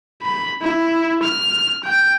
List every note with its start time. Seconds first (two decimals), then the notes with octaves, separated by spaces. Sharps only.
0.22 B5
0.62 E4
1.23 F6
1.84 G5